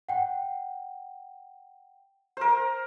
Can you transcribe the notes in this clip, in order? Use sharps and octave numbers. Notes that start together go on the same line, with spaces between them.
F#5 G5
A#4 C5